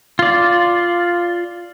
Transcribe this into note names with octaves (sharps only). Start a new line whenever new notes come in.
F4 D5